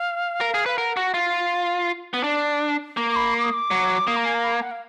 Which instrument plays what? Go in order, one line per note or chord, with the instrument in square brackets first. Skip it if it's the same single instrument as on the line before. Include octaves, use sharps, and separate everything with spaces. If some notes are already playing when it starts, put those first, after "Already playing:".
Already playing: [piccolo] F5
[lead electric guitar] A#4
G#4
[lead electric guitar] B4 [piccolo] F5
[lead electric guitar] A#4 [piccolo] F#5
[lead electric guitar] F#4
F4
B3
D4
A#3
[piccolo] D6
B5
D6
D#6
D6
[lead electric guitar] F#3
[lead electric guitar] A#3 [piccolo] D#6
[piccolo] A#5
G#5
A#5
B5
A#5
F#5
F5